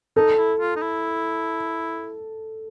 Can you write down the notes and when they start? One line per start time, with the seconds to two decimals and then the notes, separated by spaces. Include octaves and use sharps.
0.16 D#4 A4
0.38 E4
0.60 F4
0.76 D#4
0.82 E4